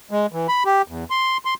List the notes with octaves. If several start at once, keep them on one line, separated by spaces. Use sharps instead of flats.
G#3
E3
B5
G4
E2
C6
C6